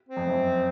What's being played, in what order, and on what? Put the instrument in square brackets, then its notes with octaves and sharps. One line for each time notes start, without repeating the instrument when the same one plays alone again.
[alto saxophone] C4
[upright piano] F2
F#2